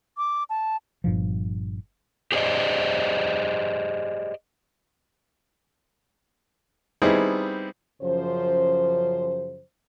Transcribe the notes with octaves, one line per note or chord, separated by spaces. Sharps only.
D6
A5
G1 G2 A#2 F3
G4 G#4 C5 D5 D#5
G3 B3 C4 D#4 E4 G#4
F#2 C#3 F3 C5